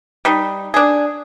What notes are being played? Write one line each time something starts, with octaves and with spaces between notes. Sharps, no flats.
G3 D#4
D4 G#4